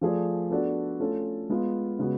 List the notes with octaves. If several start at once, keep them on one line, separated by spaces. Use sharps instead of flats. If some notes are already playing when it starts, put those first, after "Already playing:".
F3 A3 F4 G#4 D5
B3 D4 F#4 A4 D5
A3 C#4 F4 A4
G#3 B3 F4
C#3 G#3 B3 F#4